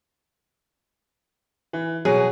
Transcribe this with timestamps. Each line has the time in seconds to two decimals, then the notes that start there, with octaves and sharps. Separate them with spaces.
1.73 E3
2.05 B2 F#3 G#4